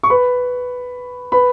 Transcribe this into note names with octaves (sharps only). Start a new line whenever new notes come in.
C#6
B4 B5
B4 B5